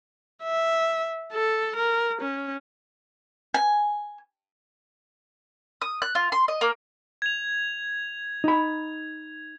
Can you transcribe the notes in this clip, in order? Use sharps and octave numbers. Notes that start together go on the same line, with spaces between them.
E5
A4
A#4
C#4
G#5
D#6
F#6
F4
C6
D#5
A#3
G#6 F7
D#4 B5